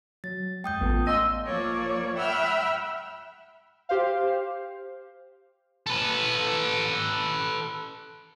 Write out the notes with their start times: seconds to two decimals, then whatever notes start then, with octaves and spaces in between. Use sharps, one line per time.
0.24 F#3 A6
0.64 F2 G#3 G5 D#6 G6
0.81 A1 B3 F4 A5
1.07 D5 D#5 F5 G5 C6 E6
1.45 F3 A#3 C#5 D5
2.16 E5 F#5 G5 B5 E6 F6
3.89 G4 C5 F5
5.87 A4 B4